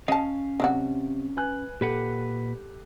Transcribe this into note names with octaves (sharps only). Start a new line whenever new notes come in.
C#4 D#5 F5 A5
C3 F#3 D4 F#4
B4 G#5 F#6
A#2 G4 A4 B4 F#5